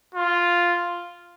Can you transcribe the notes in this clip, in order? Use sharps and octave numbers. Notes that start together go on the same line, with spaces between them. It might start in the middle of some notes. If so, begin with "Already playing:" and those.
F4